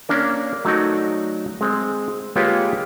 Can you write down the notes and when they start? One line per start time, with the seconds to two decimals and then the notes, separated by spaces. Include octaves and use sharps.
0.09 A#3 C#4 D4 A#4
0.65 F#3 A3 D#4 F#4 D5
1.61 G#3 C4
2.35 G#3 A#3 F4 G4 B4 C#5